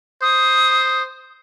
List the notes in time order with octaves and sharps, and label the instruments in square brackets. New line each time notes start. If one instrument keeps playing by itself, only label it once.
[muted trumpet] C5 [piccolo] D#6